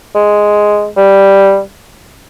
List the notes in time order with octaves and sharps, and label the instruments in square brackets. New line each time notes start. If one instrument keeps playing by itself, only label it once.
[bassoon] G#3
G3